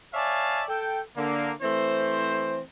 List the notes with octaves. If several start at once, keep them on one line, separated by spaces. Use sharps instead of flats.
C#5 D5 E5 F5 G#5 A5
A4 G5
D3 A#3
E3 A3 C4 C5